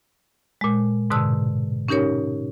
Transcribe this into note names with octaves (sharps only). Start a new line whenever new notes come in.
A#2 G#3
G#2 B2 D3 A5 E6
C#4 D#4 G4 A#4 C#5